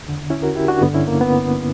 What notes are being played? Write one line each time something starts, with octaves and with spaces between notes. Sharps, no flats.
E2 D3
C#4 E4
F#4 A#4
E4 G4
D4 F#4
G2 D3 B3
C#4 E4
A#3
B3